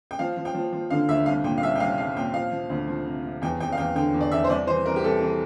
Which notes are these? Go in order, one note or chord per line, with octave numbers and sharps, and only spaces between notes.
G5
F3 F5
F3
G5
F3
F3
D3 F5
D2 E5
C2 F5
A#2 G5
F5
C2 E5
G5
C2 F5
C2 F5
A#2 G5
F3 F5
F3
D2
F3
C3
C3
E2 G5
E2 G5
F5
E2 G5
D3 G5
E2
D5
E2 E5
C5
C2 D5
E3 C5
E3 A#4
G4
C2 A4
E3